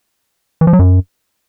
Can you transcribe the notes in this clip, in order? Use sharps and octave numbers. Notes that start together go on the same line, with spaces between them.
E3
F3
F#3
F#2